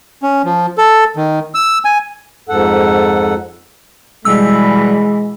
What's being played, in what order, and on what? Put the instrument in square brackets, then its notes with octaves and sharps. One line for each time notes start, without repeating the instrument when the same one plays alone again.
[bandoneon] C#4
F3
A4
D#3
E6
G#5
[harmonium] F2 G#2 A4 F#5
[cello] B2 E3 [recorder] G3 [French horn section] G#3 [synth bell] E6